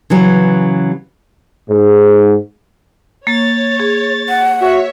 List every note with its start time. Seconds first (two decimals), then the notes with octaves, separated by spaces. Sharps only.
0.10 C#3 E3 F#3
1.70 G#2
3.27 A#3 C#5 A6
3.79 G#4
4.29 F#5
4.61 F#4 C#5 E5